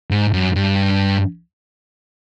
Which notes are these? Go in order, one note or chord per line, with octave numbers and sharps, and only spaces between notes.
G#2
F#2
G2